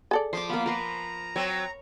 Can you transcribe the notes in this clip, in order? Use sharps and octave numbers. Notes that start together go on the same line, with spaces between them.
G#4 A4 D5
F3 C6 D6
A#3 B3 F4 B5
A#4 B4 A#5 C6
F#3 C4 C#5